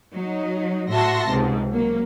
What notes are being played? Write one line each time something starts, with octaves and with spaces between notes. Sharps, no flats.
F#3 D#4
A2 F#4 E5 A5 C6 A#6
C#2 G#2 C3
F#3 A#3